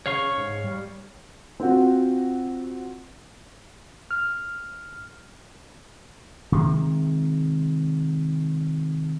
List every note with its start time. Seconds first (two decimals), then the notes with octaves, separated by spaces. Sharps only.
0.06 C#3 C#5 F5 C#6
0.37 G#2
0.64 G3
1.60 C4 F4 F#4
4.11 F6
6.52 C3 D#3 G#3